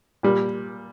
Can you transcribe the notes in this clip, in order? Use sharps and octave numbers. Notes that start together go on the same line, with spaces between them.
A#2 G3